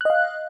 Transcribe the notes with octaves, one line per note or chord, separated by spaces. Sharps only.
D#5 F5 F#6